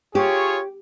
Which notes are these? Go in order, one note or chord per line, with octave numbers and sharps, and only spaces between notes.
F4 G4 G#4 C#5